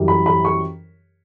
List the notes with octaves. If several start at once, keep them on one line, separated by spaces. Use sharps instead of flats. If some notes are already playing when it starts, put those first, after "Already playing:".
Already playing: F#2 E3 G3
B5
B5
C#6